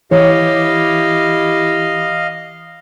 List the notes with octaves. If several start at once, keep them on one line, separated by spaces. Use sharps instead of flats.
E3 E4 G4 C#5 D#5 F5